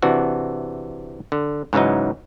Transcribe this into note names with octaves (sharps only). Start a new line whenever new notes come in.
C3 E3 D4 F#4
D3
G#2 C#3 E3 F#3 D#4